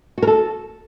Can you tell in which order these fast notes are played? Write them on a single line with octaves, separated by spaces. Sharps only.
F#4 A#4 A4